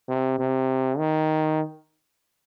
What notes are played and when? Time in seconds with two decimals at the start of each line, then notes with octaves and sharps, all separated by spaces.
0.08 C3
0.39 C3
0.98 D#3